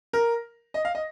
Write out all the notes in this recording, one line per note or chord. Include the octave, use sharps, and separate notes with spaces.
A#4
D#5
F5
D#5